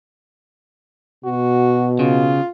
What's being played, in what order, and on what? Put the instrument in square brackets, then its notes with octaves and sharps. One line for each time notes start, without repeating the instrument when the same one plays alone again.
[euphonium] B2 [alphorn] F#4
[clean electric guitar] C#3 [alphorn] F4